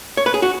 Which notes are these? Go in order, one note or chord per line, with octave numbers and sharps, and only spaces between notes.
C#5
B4
G#4
F#4